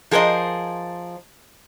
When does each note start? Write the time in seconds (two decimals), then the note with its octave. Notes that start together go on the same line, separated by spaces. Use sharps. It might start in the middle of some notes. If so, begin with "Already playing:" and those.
0.11 F3 G#4 A#4 C5 D#5